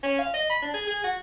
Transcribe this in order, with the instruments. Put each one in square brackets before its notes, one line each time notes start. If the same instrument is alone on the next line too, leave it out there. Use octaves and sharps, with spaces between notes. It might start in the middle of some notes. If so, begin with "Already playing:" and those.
[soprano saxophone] C#4
F5
D#5
B5
D4
G#4
G#4
F#4